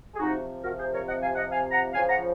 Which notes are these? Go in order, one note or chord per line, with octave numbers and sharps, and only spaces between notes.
G#4
C3 F3 D#4 F#4
F#4 A#4
G#4 C5
A#4 C#5
D#5 F#5
F5 G#5
D#5 F#5
F5 G#5
F#5 A#5
C#3 F3 F5 G#5
F#5 A#5